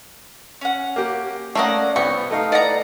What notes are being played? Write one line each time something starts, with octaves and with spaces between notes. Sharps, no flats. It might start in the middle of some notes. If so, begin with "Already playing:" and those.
C#4 F#5
A#3 G4
A3 A#3 C#4 D5 F#5 A#5 D#6
C2 B3 C#6
A3 D#4 F5
E3 D5 D#5 F#5 A#5